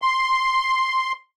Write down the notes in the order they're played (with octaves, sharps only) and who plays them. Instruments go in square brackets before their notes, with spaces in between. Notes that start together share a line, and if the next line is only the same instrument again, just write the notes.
[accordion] C6